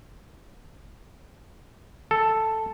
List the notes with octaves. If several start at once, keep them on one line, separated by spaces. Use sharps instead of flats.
A4